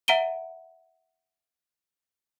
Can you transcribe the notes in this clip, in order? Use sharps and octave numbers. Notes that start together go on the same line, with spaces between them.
E5 F#5 A#5 D7 D#7 G7